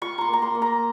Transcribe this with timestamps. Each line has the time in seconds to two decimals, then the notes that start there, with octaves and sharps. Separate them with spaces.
0.02 F4 C#6
0.18 A#5 C6
0.28 A#3
0.33 A#5
0.42 C6
0.55 A#3
0.62 A#5